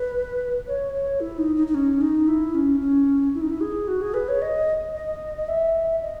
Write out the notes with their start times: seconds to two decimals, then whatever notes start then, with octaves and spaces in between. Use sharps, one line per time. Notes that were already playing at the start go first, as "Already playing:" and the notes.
Already playing: B4
0.67 C#5
0.93 C#5
1.20 E4
1.38 D#4
1.56 D#4
1.67 D#4
1.74 C#4
2.01 D#4
2.28 E4
2.54 C#4
2.80 C#4
3.34 E4
3.41 D#4
3.50 E4
3.61 G#4
3.88 F#4
4.01 G#4
4.14 B4
4.28 C#5
4.42 D#5
4.95 D#5
5.37 D#5
5.48 E5
6.02 D#5